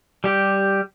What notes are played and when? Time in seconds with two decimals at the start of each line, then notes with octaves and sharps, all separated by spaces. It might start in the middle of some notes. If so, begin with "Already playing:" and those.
0.24 G3 G4